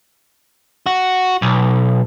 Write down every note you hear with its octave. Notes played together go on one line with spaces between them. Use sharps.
F#4
B1